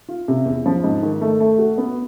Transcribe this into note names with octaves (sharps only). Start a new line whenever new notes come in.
F4
C3
E2
F3
G#2
D#3
A3
A3
F#4
B3